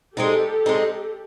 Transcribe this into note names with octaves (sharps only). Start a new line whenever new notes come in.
G#3 C4 D#4 G4 A4
G#3 C4 D#4